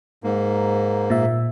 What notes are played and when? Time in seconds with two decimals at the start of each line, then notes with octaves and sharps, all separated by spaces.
0.24 G#2 A#3
1.10 A#2 E5